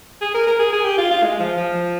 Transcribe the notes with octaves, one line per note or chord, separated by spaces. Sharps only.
G#4
A#4
A#4
G#4
G#4
G4
F4
F4
G#3
F3
F3